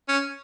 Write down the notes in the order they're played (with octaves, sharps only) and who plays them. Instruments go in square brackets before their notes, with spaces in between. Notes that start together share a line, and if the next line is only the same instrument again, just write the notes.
[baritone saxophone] C#4